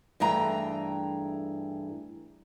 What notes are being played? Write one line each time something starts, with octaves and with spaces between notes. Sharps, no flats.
G2 E3 A3 G#4 G5 A#5